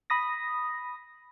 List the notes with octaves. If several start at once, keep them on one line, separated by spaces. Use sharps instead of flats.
B5 D#6 A#6